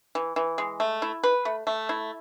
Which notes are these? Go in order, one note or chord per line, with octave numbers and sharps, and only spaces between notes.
E3
E3
G#3
A3
E4
B4
A3
A3
E4